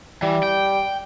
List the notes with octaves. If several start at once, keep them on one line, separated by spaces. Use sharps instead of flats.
E3 G3
G5